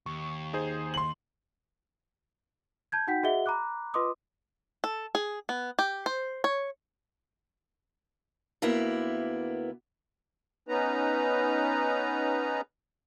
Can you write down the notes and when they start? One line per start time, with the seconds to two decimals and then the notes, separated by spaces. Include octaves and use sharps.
0.06 D#2 C#6
0.53 D#4 G#4 C5
0.94 C6 F#7
2.92 A5 G6 G#6
3.07 D#4 F#4 F#5 G5 G6 B6
3.23 F#4 G#4 D#5 E5 F#5 G7
3.46 A#5 B5 D6 F#6
3.94 F4 B4 D#5 C6 D6 D#6
4.84 A4
5.15 G#4
5.49 B3
5.79 G4
6.06 C5
6.44 C#5
8.62 D2 A#3 B3 E4
10.69 B3 C#4 D#4 B4 A#5